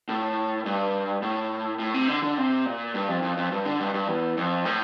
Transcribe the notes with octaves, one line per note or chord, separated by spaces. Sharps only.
A2
G2
A2
A2
C3
D3
D3
C3
A#2
G2
F2
F2
F2
G2
D3
G2
G2
E2
F2
A2